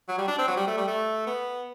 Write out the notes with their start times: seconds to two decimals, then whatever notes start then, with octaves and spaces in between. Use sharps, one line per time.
0.08 F#3
0.18 G3
0.28 D4
0.38 C4
0.48 F#3
0.57 G3
0.68 A3
0.77 G3
0.87 A3
1.27 B3